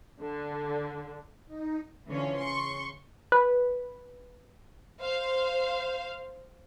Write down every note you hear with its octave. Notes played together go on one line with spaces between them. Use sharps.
D3
D#4
D3 E3 F3 C#4 F4 C#5
C#3 C6 C#6
B4
C5 F5